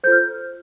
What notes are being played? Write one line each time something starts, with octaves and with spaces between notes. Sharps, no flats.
F4 A4 C5 G6
F6